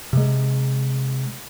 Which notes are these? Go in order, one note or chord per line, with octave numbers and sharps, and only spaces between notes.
C3 G#3